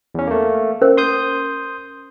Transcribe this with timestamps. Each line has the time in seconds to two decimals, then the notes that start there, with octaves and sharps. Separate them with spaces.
0.15 E2 C#4
0.27 A3 A#3
0.81 C#4 A#4 C5
0.97 C6 D#6 G6